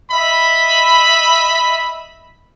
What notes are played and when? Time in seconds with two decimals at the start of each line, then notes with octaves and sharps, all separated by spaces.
0.11 D#5 E5 B5